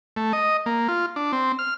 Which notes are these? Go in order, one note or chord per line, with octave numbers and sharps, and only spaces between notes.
A3
D#5
A#3
F4
D4
C4
F6